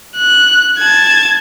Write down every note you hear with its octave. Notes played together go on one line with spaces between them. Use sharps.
F#6
A5 G#6